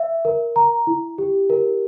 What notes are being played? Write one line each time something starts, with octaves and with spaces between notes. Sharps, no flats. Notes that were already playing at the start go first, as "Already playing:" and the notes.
Already playing: E5
A#4
A#5
E4
G4
A#4